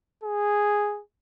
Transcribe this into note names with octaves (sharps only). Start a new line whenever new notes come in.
G#4